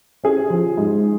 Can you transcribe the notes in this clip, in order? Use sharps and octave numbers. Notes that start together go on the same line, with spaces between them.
C#4 G#4
F3
G#2